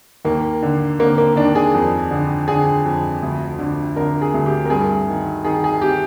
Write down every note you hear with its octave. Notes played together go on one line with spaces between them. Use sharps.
D#2 A#3
D3
D3 A#3
A#3
D#2 D4
G#4
F2
D3
D3 G#4
F2
D2
D3
D3 A#4
G#4
D2
G4
A#4
G2 G#4
D#3
D#3 G#4
G#4
G4